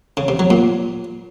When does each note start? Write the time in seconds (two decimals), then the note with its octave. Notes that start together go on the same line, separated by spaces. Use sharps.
0.17 C#3
0.28 C3
0.39 F#3
0.50 A#2